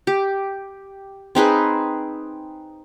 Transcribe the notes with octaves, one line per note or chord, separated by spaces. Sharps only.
G4
C4 D#4 G#4 B4